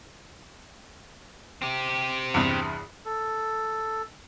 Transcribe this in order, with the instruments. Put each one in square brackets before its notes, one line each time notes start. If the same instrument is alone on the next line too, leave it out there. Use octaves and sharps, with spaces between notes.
[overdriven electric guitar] C4 G4
[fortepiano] E2 G2 C3
[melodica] A4